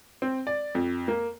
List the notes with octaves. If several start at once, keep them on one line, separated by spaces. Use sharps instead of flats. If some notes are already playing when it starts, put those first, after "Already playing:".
C4
D5
F2
A#3